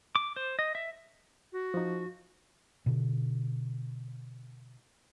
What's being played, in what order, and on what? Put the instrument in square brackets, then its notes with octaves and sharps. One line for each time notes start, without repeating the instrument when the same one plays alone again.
[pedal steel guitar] D6
C5
D#5
E5
[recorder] F#4
[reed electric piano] F3 D#4
[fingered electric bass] B2 D3